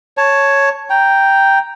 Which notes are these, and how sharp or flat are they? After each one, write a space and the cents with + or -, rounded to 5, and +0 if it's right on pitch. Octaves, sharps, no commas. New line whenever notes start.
C#5 +0 A5 +0
G5 +0 A#5 +0